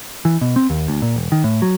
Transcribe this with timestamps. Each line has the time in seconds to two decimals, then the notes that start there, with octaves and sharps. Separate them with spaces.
0.25 E3
0.41 B2
0.56 C4
0.70 D#2
0.88 D2
1.02 A#2
1.16 E1
1.32 D#3
1.44 A2
1.62 F#3